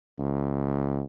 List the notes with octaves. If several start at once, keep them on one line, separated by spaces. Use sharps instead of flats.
C#2